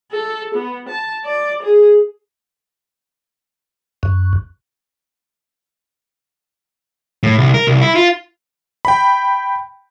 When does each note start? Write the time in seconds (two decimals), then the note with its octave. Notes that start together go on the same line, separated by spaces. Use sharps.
0.11 A4
0.55 B3
0.89 A5
1.24 D5
1.62 G#4
4.03 F#2
7.23 A2
7.38 C2
7.54 A#4
7.67 C2
7.81 E4
7.95 F4
8.85 G5 B5